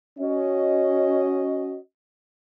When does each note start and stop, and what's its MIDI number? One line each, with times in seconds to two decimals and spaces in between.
0.19 1.77 61
0.19 1.77 66
0.19 1.77 75